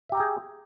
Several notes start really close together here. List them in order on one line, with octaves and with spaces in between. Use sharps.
E5 G4 A#5 G5 G#4